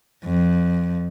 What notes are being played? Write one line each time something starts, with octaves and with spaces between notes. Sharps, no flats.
F2